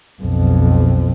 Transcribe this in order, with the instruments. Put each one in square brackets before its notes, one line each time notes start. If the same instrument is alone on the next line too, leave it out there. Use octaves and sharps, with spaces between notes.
[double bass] B1 F2